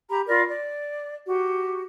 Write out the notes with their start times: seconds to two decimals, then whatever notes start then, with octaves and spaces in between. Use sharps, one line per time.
0.09 G4 A#5 B5
0.27 F4 A#4 D5 B5
0.48 D5
1.26 F#4 G4